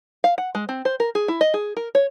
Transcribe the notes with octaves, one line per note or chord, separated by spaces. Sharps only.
F5
F#5
G#3
C4
C5
A#4
G#4
E4
D#5
G#4
A#4
C#5